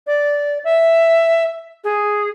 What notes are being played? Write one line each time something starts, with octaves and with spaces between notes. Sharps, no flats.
D5
E5
G#4